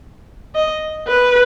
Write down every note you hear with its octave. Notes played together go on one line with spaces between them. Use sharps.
D#5
B4